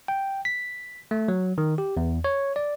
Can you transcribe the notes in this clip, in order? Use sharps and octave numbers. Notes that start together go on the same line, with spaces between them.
G5
B6
A3
F#3
D#3
G4
E2
C#5
D5